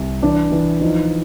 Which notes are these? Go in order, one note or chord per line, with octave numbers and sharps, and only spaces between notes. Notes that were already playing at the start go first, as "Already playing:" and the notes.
Already playing: C2
E3 D4
E3
F3 D#4